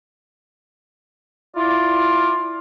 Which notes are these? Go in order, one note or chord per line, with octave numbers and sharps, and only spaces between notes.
E4 F4 D5